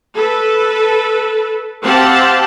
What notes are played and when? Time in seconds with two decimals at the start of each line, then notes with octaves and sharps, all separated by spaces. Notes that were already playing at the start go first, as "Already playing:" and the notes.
0.16 A4 B4
1.82 C4 G4 F5 F#5 A5